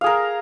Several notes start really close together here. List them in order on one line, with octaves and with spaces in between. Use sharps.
F5 G#4 A#4